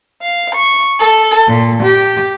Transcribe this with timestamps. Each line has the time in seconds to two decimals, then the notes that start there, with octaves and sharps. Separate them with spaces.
0.22 F5
0.55 C#6
1.01 A4
1.48 A#2
1.82 G4